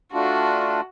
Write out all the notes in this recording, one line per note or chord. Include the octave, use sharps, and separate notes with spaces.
A3 D4 F4 F#4